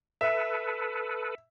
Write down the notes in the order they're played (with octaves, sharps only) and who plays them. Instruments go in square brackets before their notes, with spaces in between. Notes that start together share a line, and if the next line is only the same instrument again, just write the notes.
[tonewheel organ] A4 B4 [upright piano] E5